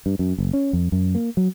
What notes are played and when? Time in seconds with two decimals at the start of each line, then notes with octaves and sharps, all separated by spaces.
0.06 G2
0.19 F#2
0.38 F#1
0.53 C#4
0.73 F2
0.92 F#2
1.15 A#3
1.37 F#3